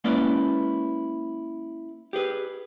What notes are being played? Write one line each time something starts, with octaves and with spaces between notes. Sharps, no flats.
G#3 A#3 C#4 E4 B4 D5
G4 G#4 B4